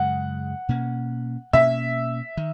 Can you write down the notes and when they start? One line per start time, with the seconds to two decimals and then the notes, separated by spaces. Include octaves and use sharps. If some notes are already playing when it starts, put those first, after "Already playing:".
Already playing: F#2 C#3 G#3 F#5
0.69 B2 A#3 C#4
1.53 B2 A#3 C#4 E5
2.37 D#3